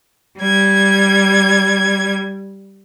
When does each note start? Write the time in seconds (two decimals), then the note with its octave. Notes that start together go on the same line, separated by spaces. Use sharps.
0.39 G3 G#6